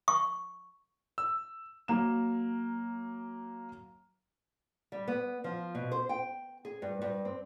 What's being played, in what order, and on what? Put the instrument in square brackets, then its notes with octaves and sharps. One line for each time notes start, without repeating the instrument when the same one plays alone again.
[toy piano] C#6
[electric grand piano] E6
[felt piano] F#3 A#3 E7
[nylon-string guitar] G3
B3
F3
B2
C5
G5
G#4
G2
G2
C4